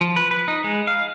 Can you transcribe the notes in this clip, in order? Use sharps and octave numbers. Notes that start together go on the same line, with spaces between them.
F3
B4
B4
D#4
G#3
F5